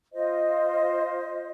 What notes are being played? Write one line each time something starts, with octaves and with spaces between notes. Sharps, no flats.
F4 C5 D#5